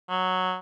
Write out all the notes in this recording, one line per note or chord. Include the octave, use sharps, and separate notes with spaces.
F#3